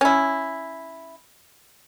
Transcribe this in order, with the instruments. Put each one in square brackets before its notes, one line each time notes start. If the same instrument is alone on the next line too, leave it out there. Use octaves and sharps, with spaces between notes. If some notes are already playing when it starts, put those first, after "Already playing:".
[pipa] C#4 E4